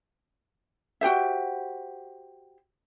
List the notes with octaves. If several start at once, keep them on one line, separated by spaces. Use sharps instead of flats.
F#4 G4 C5 E5